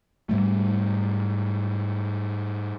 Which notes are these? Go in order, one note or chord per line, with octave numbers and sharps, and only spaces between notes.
G#2 G3 A3